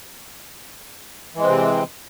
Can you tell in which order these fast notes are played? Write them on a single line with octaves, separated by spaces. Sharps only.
E3 G#3 C4 C3